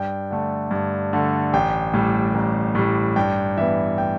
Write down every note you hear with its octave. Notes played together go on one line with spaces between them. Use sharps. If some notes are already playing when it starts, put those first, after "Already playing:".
Already playing: G2 G5
D3 A3
G2
D3 A3
A1 G5
A2 G3
A1
A2 G3
G2 G5
E3 B3 E5
G5